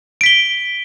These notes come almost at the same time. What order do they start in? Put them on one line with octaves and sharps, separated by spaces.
D7 B6 G7